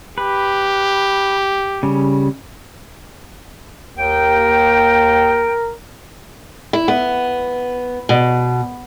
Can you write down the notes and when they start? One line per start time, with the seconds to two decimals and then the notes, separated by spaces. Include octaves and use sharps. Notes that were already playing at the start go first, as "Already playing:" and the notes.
0.18 G4 B4
1.83 C#3 G3
3.98 D#2 A#4 G5
6.73 E4
6.88 B3
8.09 B2